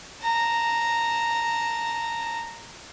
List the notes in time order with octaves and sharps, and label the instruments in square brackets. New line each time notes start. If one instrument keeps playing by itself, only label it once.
[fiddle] A5 A#5